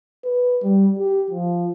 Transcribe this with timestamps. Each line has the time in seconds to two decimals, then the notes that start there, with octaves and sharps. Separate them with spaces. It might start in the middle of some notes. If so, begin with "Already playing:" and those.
0.24 B4
0.63 G3
0.99 G4
1.31 F3